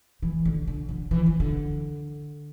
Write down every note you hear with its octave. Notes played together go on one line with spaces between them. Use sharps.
E3
D3
D3
D3
E3
E3
D3